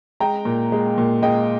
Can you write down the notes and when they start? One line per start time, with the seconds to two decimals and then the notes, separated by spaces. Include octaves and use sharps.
0.20 G#3 G5 A#5
0.45 A#2
0.72 G#3
0.98 A#2
1.22 G#3 D#5 G5